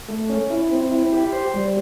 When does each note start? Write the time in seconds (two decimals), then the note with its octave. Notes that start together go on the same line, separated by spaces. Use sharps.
0.09 A3
0.29 C#4
0.50 E4
0.71 C4
0.91 E4
1.12 G4
1.32 C5
1.54 G3